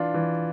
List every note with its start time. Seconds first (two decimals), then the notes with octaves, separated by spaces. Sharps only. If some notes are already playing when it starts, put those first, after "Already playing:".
Already playing: E3 D4 F4
0.14 E3